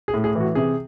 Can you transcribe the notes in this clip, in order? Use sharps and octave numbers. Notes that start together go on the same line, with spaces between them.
G#4
A2
G#4
E3
F#4
C3 G#4